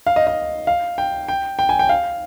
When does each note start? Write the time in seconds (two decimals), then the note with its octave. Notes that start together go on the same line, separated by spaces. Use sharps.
0.07 F5
0.16 D#5
0.27 D#5
0.67 F5
0.98 G5
1.28 G5
1.59 G5
1.69 G#5
1.79 G5
1.89 F5